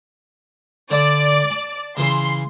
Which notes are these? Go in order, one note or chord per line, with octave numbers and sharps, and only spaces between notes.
D3 D5
A5
C#3 E3 C6